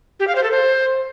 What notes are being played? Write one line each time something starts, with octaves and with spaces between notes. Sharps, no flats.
G4
F5
C5
A4
C5